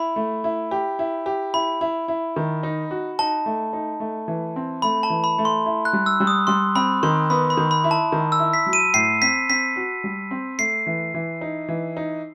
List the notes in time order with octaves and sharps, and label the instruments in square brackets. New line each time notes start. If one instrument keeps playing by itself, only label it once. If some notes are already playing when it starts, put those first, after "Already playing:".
Already playing: [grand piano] E4 [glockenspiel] B5
[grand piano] A3
E4
G4
E4
G4
[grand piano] E4 [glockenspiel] B5
[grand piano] E4
E4
D#3
D#4
F#4
[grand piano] D#4 [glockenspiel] A5
[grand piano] A3
D#4
A3
E3
C4
[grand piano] A3 [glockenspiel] B5
[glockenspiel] A5
[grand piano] E3
[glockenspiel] B5
[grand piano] A3
[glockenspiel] C6
[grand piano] E4
[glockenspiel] F#6
[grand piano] G3
[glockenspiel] E6
[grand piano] G3
[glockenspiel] D#6
[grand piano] G3 [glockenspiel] C6
[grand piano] C4 [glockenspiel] B5
[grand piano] D#3 [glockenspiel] C6
[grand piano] B3 [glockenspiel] B5
[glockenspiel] B5
[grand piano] D#3
[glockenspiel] B5
[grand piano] E4
[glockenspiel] A5
[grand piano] D#3
[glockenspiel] E6
[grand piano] E4
[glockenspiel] B6
[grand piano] F#3
[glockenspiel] D#7
[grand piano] A2 [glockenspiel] C7
[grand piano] C4 [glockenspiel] B6
[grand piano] C4 [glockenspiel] B6
[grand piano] F#4
G3
C4
[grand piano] A3 [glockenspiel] C7
[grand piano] E3
E3
D#4
E3
D#4